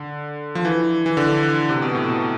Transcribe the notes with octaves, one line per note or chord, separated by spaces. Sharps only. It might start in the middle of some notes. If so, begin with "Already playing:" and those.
Already playing: D3
F3
E3
E3
D3
C3
B2
A2
B2